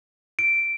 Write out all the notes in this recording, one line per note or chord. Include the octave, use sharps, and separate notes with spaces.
D7